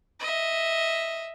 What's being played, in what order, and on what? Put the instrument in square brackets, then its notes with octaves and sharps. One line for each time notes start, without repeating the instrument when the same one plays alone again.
[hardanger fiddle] D#5 E5